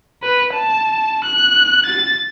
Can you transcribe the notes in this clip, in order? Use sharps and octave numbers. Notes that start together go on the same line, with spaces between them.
B4
A5
F#6
A6